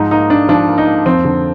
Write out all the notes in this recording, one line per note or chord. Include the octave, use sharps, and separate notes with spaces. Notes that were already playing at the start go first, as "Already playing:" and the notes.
Already playing: G#2 F3 D#4
A#3 D#4
A#3 D4
F3 D4
A#3
D#4
A#3
F2 C4
D3